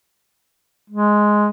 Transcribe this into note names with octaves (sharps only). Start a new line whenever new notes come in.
G#3